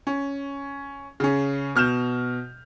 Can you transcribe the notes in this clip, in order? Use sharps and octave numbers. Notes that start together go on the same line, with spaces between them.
C#4
C#3 C#4
B2 F6 G6 E7